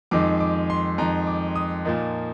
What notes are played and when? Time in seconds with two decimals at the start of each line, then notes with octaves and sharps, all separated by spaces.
0.11 F2 D#3 G#3 D6
0.40 D6
0.70 C6
0.98 F2 D#3 G#3 A#5
1.27 D6
1.56 D#6
1.85 A#2 F3 A#3 D#4